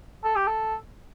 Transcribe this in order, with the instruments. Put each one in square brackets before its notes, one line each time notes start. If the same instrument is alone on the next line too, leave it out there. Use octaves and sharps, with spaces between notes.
[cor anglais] A4
G4
A4